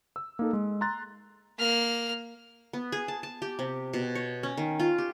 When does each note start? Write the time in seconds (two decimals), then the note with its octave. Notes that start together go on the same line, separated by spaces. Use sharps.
0.16 E6
0.39 A#3 D#4 A4
0.53 G#3
0.81 A#5 C6 F#6 A6
1.58 A#3 F6
2.73 B3
2.92 G#4
3.08 A5
3.23 A5
3.42 G4
3.59 C3
3.93 B2
4.15 C#5
4.43 C#4
4.57 D#3
4.80 F4
4.98 G4